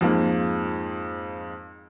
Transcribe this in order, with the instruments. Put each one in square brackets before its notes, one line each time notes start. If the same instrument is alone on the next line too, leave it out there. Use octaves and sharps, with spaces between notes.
[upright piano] F2 G#2 F3 G#3 A#3